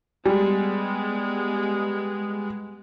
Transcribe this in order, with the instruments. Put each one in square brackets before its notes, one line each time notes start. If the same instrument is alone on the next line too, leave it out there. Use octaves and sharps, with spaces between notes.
[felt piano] G3 [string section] G#3 B3